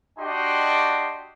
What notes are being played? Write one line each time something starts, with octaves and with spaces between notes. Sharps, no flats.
D4 F#4 G4 D#5 G5 C6